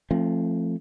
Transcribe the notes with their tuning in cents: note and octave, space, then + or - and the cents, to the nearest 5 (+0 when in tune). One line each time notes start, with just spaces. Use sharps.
F3 -20 A3 +0 C4 +35